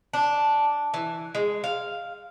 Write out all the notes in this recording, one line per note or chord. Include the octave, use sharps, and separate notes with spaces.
D4
E3
G#3
F5